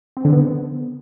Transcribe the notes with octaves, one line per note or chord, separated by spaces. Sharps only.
C4
D3
B3